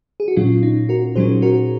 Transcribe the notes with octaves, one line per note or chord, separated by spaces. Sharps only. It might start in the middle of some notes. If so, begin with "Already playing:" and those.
G#4
F#4
A#2 F#3 C#4 F4
D#4
F#4 A#4
A#2 F#3 C#4 G#4 C5
F#4 A#4